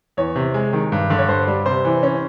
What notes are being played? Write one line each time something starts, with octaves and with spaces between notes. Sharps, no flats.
E2 C#5
C3
G#3
D#3
G2
D3
C#5
G2 C5
G3
C3 C5
E3
C#4